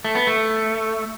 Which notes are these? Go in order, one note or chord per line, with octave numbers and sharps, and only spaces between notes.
A3
B3
A3